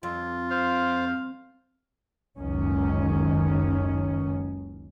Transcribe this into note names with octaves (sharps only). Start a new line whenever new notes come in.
F2 F4
C5 F5
F#1 C#2 F#2 D#3 C#4